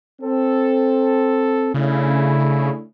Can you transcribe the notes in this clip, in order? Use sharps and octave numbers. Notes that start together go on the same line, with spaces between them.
C4 A4
C#3 A3 D4 E4